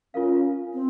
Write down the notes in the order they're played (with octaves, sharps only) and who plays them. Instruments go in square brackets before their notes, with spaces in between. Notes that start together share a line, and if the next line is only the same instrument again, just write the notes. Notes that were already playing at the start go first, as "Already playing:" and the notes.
[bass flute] C#4 [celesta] F4 A#4 F5
[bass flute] C4